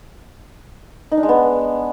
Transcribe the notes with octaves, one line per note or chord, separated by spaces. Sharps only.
D#4
D4
G#3
B3